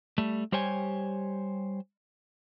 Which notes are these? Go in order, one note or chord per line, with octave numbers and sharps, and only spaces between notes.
G3 A3
G3 G4 C5 C#5 G5 G#5